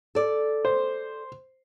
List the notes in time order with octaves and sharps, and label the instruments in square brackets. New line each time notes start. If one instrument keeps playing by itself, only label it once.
[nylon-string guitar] A4 D5
[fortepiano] C5